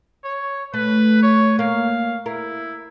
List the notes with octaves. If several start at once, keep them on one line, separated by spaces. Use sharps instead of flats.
C#5
A3 B4
C#5
A#3 F5
E4 A#4